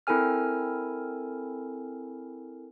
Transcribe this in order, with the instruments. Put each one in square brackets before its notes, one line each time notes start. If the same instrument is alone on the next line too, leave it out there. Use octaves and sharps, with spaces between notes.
[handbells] C4 E4 A4 A#4 G#5 F6